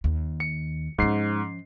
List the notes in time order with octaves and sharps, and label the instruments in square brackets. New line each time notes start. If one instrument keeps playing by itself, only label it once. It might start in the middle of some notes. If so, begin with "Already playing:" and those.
[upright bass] D#2
[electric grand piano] C#7
[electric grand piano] G#2 C7 [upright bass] F3 C#4